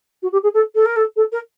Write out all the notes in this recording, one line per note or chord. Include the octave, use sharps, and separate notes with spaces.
F#4
G4
G#4
A4
A4
A#4
A4
A4
A#4